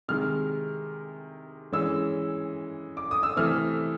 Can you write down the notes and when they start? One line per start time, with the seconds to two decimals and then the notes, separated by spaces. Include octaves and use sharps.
0.08 C3 D#3 G#3 F6
1.72 E3 G#3 C#4 E6
2.97 D6
3.11 D#6
3.23 E6
3.37 C3 E3 A3 C4 F6